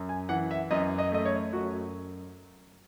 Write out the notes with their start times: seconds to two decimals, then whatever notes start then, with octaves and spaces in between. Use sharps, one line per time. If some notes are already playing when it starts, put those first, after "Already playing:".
Already playing: F#2
0.09 G#5
0.29 E3 F#5
0.51 E5
0.71 F#2 D#5
0.98 D#5
1.12 A3 D#5
1.25 C#5
1.53 F#2 F#4